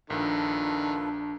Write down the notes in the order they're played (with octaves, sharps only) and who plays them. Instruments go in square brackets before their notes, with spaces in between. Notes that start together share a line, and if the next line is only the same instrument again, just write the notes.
[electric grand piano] A#1 [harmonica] D#3 [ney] D4 [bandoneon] F4 A4 B4